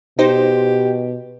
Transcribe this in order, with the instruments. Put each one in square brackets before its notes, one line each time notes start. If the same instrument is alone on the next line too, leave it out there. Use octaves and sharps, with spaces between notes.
[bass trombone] B2 [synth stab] D#4 C5 [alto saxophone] G4